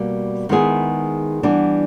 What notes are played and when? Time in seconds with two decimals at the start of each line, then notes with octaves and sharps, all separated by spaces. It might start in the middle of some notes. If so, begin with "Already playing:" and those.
Already playing: B2 G3 A#3
0.49 D#3 G#3 B3 E4 G#4
1.43 E3 G3 B3 D4